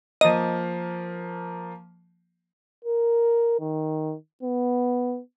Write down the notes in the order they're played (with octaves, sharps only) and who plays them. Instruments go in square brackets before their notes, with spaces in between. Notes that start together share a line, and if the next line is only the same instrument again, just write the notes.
[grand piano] F3 A#3 [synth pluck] D#5
[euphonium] A#4
D#3
B3